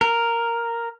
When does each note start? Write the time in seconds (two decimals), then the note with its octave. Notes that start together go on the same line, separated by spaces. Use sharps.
0.01 A#4